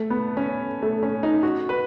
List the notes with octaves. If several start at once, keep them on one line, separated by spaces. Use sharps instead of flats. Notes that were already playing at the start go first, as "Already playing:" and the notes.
Already playing: A3
B3
C#4
A3
C#4
D#4
F#4
B4